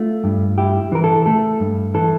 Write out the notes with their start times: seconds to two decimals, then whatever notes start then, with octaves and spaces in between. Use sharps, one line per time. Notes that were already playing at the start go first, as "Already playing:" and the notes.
Already playing: A3 F4
0.24 G2
0.58 E4 G4
0.92 E3 A#4
1.04 A4
1.26 A3 A4
1.60 G2
1.94 E3 A4